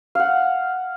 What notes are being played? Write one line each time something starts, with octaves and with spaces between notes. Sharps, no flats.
F5 F#5